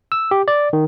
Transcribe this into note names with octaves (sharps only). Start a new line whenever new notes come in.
E6
G4
D5
D#3